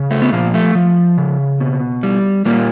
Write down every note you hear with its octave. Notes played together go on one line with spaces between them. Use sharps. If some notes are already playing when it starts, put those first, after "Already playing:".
Already playing: C#3
A3
B3
A#2 F3 A#3
A3
F3
C#3
B2
G3
A#2 G3 A#3